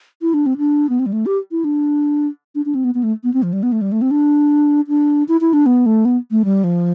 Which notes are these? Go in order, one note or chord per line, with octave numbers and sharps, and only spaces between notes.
E4
D4
C4
D4
B3
C4
G3
A3
G4
E4
D4
D4
D4
C4
B3
B3
A3
B3
C4
F3
G3
B3
A3
G3
A3
C4
D4
D4
E4
E4
D4
B3
A3
B3
A3
G3
F3